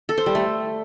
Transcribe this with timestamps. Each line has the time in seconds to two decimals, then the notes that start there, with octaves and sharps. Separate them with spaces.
0.09 A4
0.18 C5
0.26 G3
0.35 A3